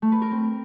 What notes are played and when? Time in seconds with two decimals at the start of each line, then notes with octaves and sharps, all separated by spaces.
0.02 A3
0.12 B4
0.22 A#4
0.31 C4